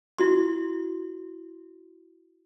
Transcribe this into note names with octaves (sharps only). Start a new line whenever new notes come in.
E4 F#4 C6